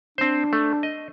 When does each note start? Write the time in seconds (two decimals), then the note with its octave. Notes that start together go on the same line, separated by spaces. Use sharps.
0.18 C4 D4 C5
0.53 A3
0.83 D#5